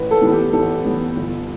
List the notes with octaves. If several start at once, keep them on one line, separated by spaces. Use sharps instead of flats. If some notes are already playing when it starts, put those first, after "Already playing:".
Already playing: A1 B4
A4
A2 E3 G3 B3
G4
A1 A4
A2 E3 G3 B3
G1